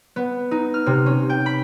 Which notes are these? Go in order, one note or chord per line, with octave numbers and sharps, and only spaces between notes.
B3
D#4
F6
C3
C#4
G5
B5